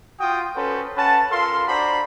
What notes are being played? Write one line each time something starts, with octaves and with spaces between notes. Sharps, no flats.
F4 F#4 G5 D#6
C#4 F#4 A4 B4 C5
C#4 B4 F#5 A5
F4 A4 A#4 F5 C6
D4 F#4 C5 D5 A#5 B5